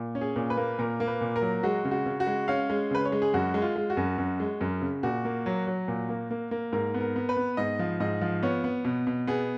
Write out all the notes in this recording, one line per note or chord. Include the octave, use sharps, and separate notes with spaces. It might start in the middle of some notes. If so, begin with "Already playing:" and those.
Already playing: A#2
C#4
G#4
A#2
B4
A#3
A#2 A#4
A#3
B4
A#2
A#4
F#3
G#3 F#4
C#3
F#4
C#3
F#4
G#3
C#4 F5
G#3
C#3 B4
C#5
G#3
G#4
F#2 F#4
G#3
F4
G#3
F#4
F#2
F#2
G#3
F#2
C#3
A#2 F#4
A#3
F#3
F#3
A#2
A#3
A#3
A#3
G#2 A#4
B3
A#4
B3
B4
B3
G#2 D#5
F3
G#2 D#5
F3
B3 C#5
B3
B2
B2
B3 G#4